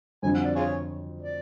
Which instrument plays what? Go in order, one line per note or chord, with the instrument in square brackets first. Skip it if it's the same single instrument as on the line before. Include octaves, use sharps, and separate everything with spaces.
[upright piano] F2 D3 F#3 [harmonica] G#5
[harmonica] F#5
D5
F4 G#4 C#5
D5